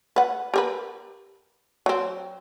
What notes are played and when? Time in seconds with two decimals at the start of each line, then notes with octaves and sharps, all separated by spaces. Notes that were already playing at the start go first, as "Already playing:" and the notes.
0.16 B4 F#5
0.54 G4 A#4 B4
1.86 F#3 C4